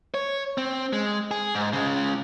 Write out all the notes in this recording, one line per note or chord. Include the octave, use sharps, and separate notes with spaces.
C#5
C4
G#3
G#4
G#2
C#3 G#3